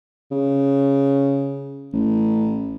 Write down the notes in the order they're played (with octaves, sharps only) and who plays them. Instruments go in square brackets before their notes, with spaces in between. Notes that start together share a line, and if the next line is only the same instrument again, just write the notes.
[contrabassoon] C#3
A1